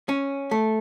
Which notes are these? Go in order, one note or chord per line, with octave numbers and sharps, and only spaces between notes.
C#4
A3